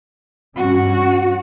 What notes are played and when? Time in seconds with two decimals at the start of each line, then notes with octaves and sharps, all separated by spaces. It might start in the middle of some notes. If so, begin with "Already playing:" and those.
0.57 G2 C#4 F#4